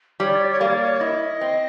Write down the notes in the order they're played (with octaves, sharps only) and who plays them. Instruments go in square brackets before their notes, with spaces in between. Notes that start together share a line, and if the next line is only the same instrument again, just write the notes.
[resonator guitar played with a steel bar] G3 [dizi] C#5
[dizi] D5
C#5
D5
C#5
[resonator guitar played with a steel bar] A#3 [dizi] D5
[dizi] C#5
D5
C#5
[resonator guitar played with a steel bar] E4 [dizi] D#5
[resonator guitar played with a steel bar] C4